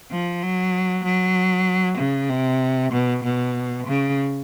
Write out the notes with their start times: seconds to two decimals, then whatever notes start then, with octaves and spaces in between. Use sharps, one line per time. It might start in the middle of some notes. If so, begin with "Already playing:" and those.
0.11 F3
0.42 F#3
1.04 F#3
1.98 C#3
2.29 C3
2.92 B2
3.23 B2
3.86 C#3